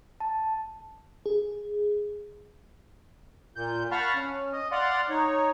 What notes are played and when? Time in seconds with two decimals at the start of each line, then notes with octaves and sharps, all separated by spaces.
0.20 A5
1.26 G#4
3.56 A#2 G6
3.92 F5 F#5 A5 B5 C#6 F6
4.16 C#4
4.53 D#5
4.72 D5 F5 F#5 C6
5.09 D#4 C#5